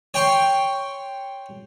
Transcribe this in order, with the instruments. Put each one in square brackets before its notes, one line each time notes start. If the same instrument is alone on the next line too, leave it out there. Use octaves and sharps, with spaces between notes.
[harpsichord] C#5 G5 C6 C#6